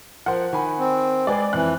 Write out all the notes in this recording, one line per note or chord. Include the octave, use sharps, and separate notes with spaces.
F3 A#4 C5 F#5
D#3 G#5 B5
C4
G#3 G#4 B4 D5
F2 E3 F#6